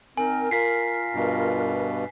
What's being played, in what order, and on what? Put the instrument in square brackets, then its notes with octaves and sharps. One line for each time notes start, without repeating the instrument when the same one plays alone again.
[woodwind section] D#3 C4 A#4 [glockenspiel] G#5
[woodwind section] F4 A#4 [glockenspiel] B6 C7
[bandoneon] G2 B2